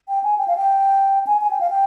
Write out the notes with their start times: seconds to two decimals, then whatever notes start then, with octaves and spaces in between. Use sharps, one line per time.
0.08 G5
0.24 G#5
0.38 G5
0.48 F5
0.57 G5
1.27 G#5
1.41 G#5
1.51 G5
1.61 F5
1.70 G5